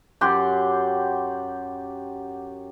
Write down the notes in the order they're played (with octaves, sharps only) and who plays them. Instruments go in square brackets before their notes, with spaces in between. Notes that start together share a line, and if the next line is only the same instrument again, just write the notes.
[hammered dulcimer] F#2 G4 F#5 C6